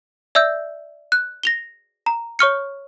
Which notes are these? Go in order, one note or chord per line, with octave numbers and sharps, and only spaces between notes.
D5 E5 E6 G6
F#6
A#6 F7 G7
A#5
C#5 C#6 F6 C#7